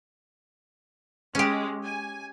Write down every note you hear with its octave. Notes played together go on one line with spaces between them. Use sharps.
G#3 C#4 G4
G#5